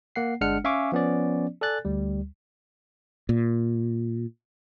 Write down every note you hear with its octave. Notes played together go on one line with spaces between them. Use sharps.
A#3 F#5 C7
G1 G#3 D4 F#5 F6 C#7
C#4 E5 F5 G#5 C#6 D6
F3 B3 C#4 D5
A4 D5 G#5 F#6 A6
D2 G3
A#2